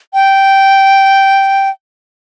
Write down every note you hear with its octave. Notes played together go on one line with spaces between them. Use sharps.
G5